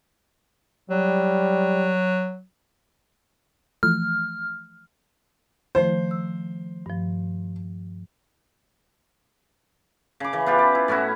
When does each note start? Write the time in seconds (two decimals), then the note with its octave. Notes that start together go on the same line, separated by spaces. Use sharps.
0.90 F#3 G3
3.83 E3 F3 A3 F6
5.75 D#3 F3 A3 C5
6.11 E6
6.86 G2 F3
10.20 C#3 D6
10.33 C#3 E3
10.46 B3 F4 G4 B4
10.59 D5
10.75 E4
10.88 A2 C#4 E4 F#4